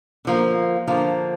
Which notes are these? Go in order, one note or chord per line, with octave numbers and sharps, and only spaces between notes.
D3 F3 A#3
D3 F3 A#3